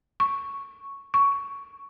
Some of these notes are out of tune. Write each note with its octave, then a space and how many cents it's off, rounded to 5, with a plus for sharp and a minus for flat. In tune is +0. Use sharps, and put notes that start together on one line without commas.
C#6 +0
C#6 +10